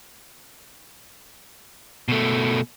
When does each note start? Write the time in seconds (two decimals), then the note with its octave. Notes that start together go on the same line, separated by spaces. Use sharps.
2.08 B2 A3